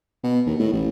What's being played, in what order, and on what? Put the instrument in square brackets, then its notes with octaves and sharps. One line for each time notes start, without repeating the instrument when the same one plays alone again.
[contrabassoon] B2
D#2
A2
A1